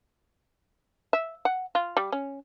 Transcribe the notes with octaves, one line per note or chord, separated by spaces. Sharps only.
E5
F#5
F4
G3
C#4